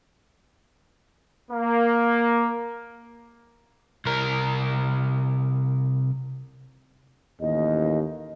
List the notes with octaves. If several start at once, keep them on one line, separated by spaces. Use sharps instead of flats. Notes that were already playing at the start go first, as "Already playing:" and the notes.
A#3
C2 A#4
A1 D#2 D#5